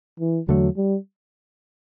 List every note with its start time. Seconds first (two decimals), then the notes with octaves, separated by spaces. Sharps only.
0.20 E3
0.48 E2 D3 F#3 A3
0.77 G3